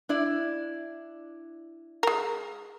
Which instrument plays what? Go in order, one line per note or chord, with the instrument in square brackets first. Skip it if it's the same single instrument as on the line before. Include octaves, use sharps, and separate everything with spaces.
[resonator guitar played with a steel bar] D4 E4 D5
[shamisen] G#3 A#4